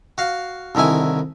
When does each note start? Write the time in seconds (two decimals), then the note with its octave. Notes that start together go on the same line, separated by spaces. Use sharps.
0.18 F#4 F5
0.75 C2 D3 D#3 E4 G#5